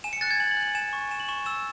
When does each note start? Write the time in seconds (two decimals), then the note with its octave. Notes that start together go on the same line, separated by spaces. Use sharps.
0.04 G#5 E7
0.13 C#7
0.21 F#6 A6
0.31 G#6
0.40 G#5 F#7
0.51 F#7
0.57 F#6
0.63 F#7
0.75 G#5 E7
0.93 C#6
1.11 G#5 E7
1.20 F#7
1.29 C#6 E7
1.46 E6 E7